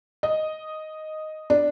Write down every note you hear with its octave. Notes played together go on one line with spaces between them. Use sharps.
D#5
D4